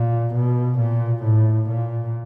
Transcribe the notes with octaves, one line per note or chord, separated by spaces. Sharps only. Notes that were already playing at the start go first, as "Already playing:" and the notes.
Already playing: A#2
B2
A#2
A2
A#2